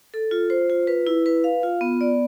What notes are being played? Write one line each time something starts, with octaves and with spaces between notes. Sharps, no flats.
A4
F4
C5
F4
B4
E4
B4
F5
F4
B3
D5